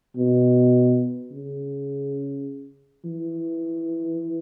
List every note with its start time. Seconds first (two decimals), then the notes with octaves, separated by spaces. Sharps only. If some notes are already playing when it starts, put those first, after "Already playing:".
0.16 B2
1.32 C#3
3.05 E3